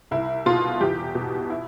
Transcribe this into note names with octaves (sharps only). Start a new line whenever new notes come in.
C2 E4
B2 F4
E2 G4
B2
E4